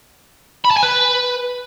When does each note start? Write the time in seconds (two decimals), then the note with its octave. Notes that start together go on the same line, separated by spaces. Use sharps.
0.65 B5
0.71 A5
0.77 G#5
0.83 B4